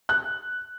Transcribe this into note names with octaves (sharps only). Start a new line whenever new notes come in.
F#6